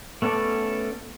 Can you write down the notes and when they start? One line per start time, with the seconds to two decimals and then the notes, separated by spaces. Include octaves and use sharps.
0.22 A3 B3 C#4 A4 D5